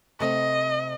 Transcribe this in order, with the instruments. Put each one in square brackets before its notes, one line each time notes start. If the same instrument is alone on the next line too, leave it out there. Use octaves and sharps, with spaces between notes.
[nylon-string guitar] C3 A3 C4 [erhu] D#5